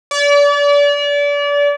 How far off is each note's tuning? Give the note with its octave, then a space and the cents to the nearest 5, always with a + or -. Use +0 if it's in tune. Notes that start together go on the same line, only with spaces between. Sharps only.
D5 -35